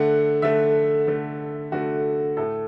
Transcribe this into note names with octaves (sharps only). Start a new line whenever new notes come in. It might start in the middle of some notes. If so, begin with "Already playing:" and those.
Already playing: D3 A3 F#5
D3 A3 E5
D3 A3
D3 A3 F#4
A2 A3 A4